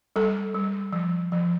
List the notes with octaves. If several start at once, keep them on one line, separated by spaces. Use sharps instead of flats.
G3 A4
G3
F3
F3